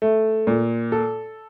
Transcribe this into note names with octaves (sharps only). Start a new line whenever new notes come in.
A3
A#2
A4